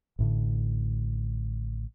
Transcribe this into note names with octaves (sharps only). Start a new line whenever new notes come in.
A1 A2 D3